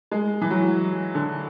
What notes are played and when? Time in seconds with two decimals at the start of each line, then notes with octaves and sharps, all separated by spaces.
0.11 G#3
0.41 E3
0.50 F#3
1.15 D3